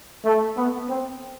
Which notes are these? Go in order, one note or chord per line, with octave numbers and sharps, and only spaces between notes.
A3
B3
C4